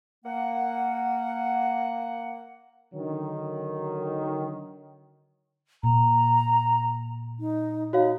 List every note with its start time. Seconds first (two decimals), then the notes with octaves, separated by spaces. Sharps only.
0.25 A#3 F#5
2.94 D3 D#3 F#3
5.83 A#2 A#5
7.40 D#4
7.93 D#4 F#4 C#5 F5